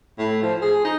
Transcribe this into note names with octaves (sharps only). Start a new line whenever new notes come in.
A2
F3
G#4
D#4